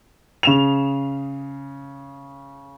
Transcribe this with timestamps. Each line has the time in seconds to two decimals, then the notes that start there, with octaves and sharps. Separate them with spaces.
0.43 C#3 E7 F7